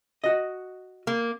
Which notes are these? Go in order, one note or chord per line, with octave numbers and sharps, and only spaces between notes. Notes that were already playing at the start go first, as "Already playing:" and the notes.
F#4 D#5
A#3